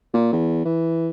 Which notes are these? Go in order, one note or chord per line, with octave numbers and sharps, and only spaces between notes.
A#2
E2
E3